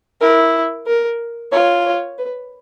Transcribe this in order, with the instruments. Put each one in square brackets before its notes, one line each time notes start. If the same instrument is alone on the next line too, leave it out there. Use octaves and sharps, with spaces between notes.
[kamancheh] E4 [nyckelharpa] A#4
[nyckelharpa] A#4
[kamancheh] F4 [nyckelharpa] C#5
[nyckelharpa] C#5
B4